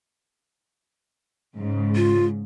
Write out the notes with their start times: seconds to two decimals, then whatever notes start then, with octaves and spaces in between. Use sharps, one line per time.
1.55 G#2 C#3
1.95 F4